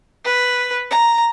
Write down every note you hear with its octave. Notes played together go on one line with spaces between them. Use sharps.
B4
A#5